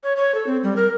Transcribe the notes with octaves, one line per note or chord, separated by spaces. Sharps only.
C#5
C#5
A4
C4
G3
A#4